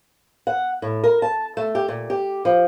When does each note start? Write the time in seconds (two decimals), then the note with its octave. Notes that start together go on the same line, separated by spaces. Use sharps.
0.47 F#5
0.82 A2
1.04 A#4
1.22 A5
1.57 A3
1.75 G4
1.88 A#2
2.10 G4
2.45 F3